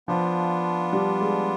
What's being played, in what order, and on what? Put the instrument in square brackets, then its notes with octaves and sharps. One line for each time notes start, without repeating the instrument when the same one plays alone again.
[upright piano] F3 [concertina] B3 D4 F4
[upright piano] G3
G#3